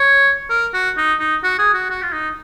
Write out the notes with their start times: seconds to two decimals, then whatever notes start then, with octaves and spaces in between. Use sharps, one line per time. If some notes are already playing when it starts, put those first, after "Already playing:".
Already playing: C#5
0.50 A#4
0.74 F#4
0.97 D#4
1.20 D#4
1.43 F#4
1.59 G#4
1.74 F#4
1.90 F#4
2.03 F4
2.12 D#4